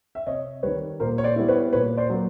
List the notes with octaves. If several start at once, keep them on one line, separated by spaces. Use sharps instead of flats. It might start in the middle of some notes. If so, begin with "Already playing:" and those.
E5
C3 C#5 D#5
D#3 G3 B4 C#5
A#2 A#4 C5
C#5
C5 D5
G3 B3 E4
B4 C#5
A#2 B4 C#5
C5 D5
F#3 A#3